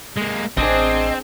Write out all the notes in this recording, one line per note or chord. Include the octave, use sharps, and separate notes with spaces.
G#3 A#3
A1 C4 D4 G#4 C5 D#5